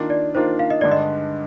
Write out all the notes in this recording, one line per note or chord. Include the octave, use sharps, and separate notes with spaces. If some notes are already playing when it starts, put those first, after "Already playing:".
Already playing: D#3 A#3 D4 F4
D5
D#3 A#3 D4 F4 C5
F5
D#5
G2 D3 G#3 D4 D5
D#5